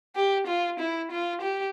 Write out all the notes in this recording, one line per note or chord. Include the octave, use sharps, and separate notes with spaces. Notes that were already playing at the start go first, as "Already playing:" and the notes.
G4
F4
E4
F4
G4